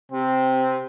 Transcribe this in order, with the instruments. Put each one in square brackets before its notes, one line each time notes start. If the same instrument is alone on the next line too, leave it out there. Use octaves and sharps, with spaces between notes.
[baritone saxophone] C3 [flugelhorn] C4